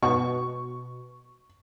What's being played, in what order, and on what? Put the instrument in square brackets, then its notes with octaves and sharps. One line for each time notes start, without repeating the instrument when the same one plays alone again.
[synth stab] B2 [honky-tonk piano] C#6